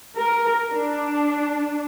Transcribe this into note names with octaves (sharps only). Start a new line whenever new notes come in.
A#4
D4